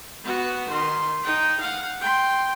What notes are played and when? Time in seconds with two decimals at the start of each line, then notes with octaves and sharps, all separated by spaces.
0.24 B3 F#4
0.69 D#3 C6
1.22 D#4 G5
1.61 F5 F#5
2.01 G5 C6